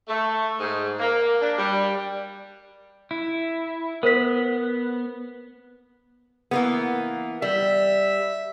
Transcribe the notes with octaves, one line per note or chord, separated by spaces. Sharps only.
A3
G#2
A#3
D4
G3
E4
B3 A#4 C5 B6
E3 A#3 B3
G3 E5